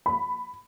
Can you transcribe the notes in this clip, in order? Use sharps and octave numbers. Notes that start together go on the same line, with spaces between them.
B5